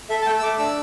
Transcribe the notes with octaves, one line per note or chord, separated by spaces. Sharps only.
A4 E5
A5
A3 G5
E6
A3 D6
D4 E6